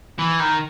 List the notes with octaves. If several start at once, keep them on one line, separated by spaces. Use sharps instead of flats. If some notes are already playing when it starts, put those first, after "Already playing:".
E3
D#3